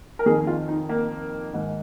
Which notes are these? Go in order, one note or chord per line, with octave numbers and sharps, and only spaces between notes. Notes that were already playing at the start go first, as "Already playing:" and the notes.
A#4
F2 D#3 G#4
F4
D#4
A#3
G#2 D#3